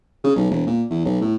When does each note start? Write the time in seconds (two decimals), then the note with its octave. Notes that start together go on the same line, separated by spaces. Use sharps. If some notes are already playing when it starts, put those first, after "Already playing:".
0.24 C#3
0.36 B1
0.50 E1
0.66 A#2
0.90 E2
1.05 B1
1.21 A2